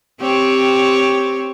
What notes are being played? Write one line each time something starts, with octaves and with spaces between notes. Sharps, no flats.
C4 G4 C#5